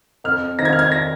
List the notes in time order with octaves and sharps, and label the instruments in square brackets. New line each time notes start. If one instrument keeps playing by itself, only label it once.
[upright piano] F2 F6
D#3 C4 D#4 A#6
G#6
F6
G#6
A#6